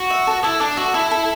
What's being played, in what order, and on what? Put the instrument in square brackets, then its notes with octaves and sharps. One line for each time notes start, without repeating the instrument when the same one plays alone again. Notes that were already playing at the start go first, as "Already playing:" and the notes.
Already playing: [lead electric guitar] F#4
[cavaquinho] E5
A4
[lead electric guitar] E4 [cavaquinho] A5
[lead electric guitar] D4 [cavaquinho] A4
[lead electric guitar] F#4 [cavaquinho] E5
[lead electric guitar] E4 [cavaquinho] A4
[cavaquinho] A4